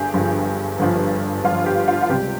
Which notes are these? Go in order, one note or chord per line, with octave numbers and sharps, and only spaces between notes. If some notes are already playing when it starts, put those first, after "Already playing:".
Already playing: G1 G2 G4 G#4
G1 G2 F3
G1 G2 F3
G1 G2 F3 F4
G4
F4
F4
C#2 C3 G3 G4